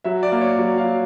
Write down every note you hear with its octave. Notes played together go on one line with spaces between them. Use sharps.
F#3 E5
D5
A#3
C#5
F#3
F5
F#3